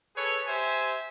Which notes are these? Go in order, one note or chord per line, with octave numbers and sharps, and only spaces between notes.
G#4 A4 B4 C#5
G4 C5 E5 G#5